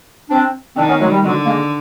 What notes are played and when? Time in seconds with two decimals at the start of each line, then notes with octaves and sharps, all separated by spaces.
0.30 C4 D4
0.76 D#3 C4 D4
0.88 B3 C#4
0.99 F#3 G#3
1.11 G3
1.23 D3 F#3 G#3
1.46 G#3 A#3